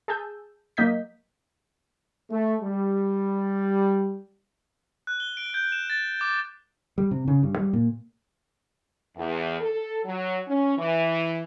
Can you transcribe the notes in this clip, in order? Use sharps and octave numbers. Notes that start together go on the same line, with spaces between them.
G#4 G#5 A5 E6 G6
F#3 A#3 D#5 G6 B6
A3
G3
F#6
G7
D7
G6
E7
A6
D6
G3
C3
C#3
G2
G3
A#2
E2
A4
F#3
C#4
E3